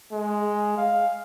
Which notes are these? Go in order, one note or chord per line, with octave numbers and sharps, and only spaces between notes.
G#3
F5